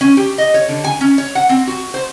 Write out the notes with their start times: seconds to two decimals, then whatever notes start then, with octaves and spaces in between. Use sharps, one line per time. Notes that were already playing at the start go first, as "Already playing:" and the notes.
0.01 C#4
0.17 G4
0.38 D#5
0.54 C#5
0.68 D3
0.84 G#5
1.01 C#4
1.18 C#5
1.35 F#5
1.49 C4
1.67 F#4
1.94 C5